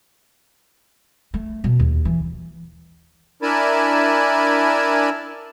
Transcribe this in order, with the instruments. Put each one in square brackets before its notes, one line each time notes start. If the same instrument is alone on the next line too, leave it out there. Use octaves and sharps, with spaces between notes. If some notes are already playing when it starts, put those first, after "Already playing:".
[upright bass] A3
B2
D#2
E3
[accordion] D4 E4 A#4 G#5 A5 B5